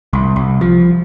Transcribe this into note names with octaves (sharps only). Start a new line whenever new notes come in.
C2
C2
F3